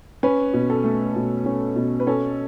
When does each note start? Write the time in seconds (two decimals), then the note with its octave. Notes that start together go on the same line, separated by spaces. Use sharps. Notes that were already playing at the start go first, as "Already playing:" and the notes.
0.23 C#4 B4
0.53 B2
0.70 A4
0.84 A3
1.16 B2
1.46 C#4
1.76 B2
2.00 B4
2.07 C#4 A4